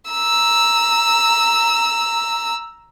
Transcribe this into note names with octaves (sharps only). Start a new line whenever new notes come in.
A#5 E6